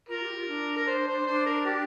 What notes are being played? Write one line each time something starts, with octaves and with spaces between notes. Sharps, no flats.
F4 A#4
G4
F4
D4
A#4
C5
C5
D4 C5
A#4
G4